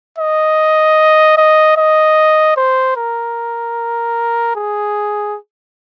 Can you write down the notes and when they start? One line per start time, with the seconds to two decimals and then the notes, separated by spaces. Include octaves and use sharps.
0.18 D#5
1.38 D#5
1.77 D#5
2.57 C5
2.97 A#4
4.56 G#4